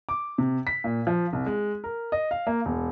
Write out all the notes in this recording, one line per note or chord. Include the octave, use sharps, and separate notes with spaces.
D6
C3
B6
A#2
F3
C2
G#3
A#4
D#5
F5
A#3
E1